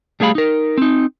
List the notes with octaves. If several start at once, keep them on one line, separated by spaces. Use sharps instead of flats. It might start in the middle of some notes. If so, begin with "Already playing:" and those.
G3 A3 G#4 F5 B5
D#4 A#4
C4 D#4